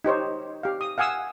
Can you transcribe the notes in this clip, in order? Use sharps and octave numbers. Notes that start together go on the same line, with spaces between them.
D#4 G4 C5 C#5
G4 F5
D#6
F5 F#5 G#5 D#6 E6